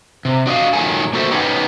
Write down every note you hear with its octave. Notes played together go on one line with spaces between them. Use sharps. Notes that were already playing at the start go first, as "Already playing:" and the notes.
C3
D4 F#4 D#5 F5
A#2 D#3 F#3 G#3 A4 G#5
A#3 F#4 A4 C5 E5
B3 C#4 D#4 G4